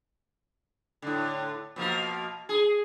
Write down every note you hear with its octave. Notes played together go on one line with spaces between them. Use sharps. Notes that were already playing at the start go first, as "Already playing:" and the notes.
A2 D3
B2 F3 A#3
G#4